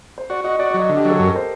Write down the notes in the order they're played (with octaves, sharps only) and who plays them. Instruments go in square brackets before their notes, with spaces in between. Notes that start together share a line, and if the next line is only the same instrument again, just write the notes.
[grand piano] C5
[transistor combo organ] F#4 [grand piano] D5
[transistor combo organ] F#4 [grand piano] D#5
[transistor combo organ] F#4 [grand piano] D5
[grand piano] D5
[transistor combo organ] F#3
[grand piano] D#5
[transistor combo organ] D3
[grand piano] G4
[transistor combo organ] F#3 [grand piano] A4
[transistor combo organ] F#2 [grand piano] A#4
[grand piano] C5